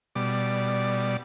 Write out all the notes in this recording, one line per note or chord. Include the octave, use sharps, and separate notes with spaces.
B2 G3 D5